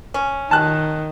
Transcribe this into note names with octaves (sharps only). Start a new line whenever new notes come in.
C#4
D#3 A5 F#6